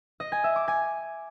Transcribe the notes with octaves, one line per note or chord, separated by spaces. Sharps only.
D#5
G#5
E5
D6
G#5